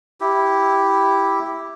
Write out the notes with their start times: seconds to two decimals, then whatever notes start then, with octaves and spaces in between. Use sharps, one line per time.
0.20 E4 G4